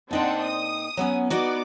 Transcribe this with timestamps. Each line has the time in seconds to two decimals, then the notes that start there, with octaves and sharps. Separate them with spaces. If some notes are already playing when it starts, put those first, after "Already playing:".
0.11 A#2 C4 D4 D#4 F#5 G5
0.43 D#6
0.97 F#3 B3 C#4
1.30 B3 D#4 F#4 D5 D6